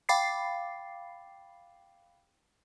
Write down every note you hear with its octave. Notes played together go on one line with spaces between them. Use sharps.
F5 G5 B5 D6 A6 C7